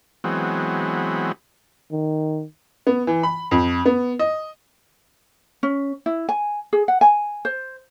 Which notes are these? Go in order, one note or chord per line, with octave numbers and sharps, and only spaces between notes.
E3 F#3 G#3 B3 C4
D#3
B3
E3
B5
F2
B3
D#5
C#4
E4
G#5
G#4
F#5
G#5
C5